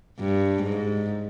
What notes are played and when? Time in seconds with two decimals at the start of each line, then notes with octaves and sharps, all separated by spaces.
0.20 G2
0.63 G#2